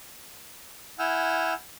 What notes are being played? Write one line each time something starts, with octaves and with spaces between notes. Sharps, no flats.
E4 F#5 G#5 E6 F6 G6